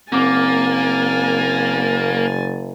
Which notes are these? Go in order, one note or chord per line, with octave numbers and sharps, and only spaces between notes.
F#1 A#3 C4 G#5 D6 A6